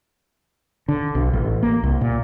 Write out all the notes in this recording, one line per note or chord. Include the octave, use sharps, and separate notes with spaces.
D3
B1
A1
A#3
C2
A#2